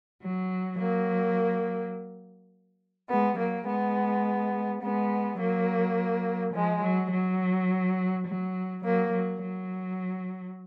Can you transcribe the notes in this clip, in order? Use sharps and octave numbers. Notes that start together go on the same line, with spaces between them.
F#3
F#3 A#3
G#3 B3
F#3 A#3
G#3 B3
G#3 B3
F#3 A#3
F3 G#3
F#3
F#3
F#3
F#3 A#3
F#3
F#3